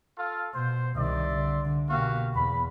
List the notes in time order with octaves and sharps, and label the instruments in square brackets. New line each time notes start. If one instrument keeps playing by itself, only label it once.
[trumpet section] F4 A4 F5
[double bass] B2 [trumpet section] C5
[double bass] C2 D#3 [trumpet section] D5 E5 C6
[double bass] D3
[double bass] B2 A#3 [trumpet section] F#4 G4 F5
[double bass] E2 [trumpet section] B5